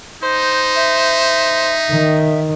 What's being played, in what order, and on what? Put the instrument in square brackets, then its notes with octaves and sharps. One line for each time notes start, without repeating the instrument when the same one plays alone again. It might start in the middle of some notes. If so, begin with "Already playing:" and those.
[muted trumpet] D#4 [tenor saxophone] C5
[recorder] E5
[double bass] D#3